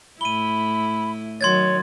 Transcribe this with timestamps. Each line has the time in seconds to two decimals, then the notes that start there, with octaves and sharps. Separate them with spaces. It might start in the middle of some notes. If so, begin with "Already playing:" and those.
0.21 A2 E4 B5 D#7 G7
1.41 D#3 F#3 C#5 C6 G#6 A6